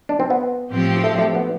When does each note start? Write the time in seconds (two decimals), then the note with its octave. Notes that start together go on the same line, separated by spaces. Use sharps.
0.09 D4
0.20 C4
0.30 B3
0.71 A2 F3 C4 G4
1.04 A3
1.19 A3
1.35 B3